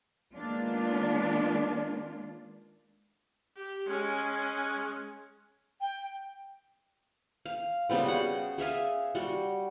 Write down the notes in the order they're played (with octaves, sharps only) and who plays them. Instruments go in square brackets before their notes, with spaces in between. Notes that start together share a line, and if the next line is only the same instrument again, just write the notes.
[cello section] D#3 G#3 A#3 B3 D4 F4
[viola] G4
G#3 C#4
[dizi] G5
[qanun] F5
C#3 G3 B3 C4
F#4 F#5
G#4 E5 F5 G#5
G3 F#4